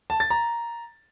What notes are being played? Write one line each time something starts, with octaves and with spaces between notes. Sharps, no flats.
A5
A6
A#5